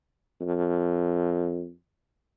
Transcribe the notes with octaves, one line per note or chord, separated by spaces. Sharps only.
F2